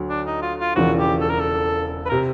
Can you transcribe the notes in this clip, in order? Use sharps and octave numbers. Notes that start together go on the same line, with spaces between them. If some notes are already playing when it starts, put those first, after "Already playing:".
Already playing: D2 F#3
D4
D#4
F4
F4
E1 E2 C#3 F3 F#4
G4
A4
A#4
A4
B4
C3 A#4